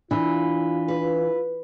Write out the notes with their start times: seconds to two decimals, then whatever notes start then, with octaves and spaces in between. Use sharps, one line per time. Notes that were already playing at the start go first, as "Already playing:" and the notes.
0.11 E3 D4 F4
0.88 B4